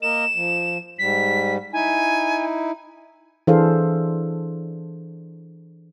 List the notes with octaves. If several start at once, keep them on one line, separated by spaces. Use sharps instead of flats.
A#3 A#4 D#5 E7
F3
G#2 G3 B6
D#4 E4 G#5
E3 D4 G#4 A4 C5 F5